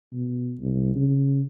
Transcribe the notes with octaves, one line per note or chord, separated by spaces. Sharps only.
B2
C2
C#3